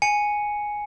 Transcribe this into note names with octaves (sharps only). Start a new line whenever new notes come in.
G#5 C#7